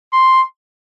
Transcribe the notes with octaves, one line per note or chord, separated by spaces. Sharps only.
C6